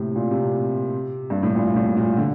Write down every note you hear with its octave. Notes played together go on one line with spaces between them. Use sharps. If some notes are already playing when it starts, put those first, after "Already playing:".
Already playing: A2 C3
A#2
C3
G2
A2
A#2
A2
A#2
D3